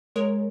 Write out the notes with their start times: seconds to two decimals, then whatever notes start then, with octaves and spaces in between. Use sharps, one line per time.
0.16 G#3 A#4 C#5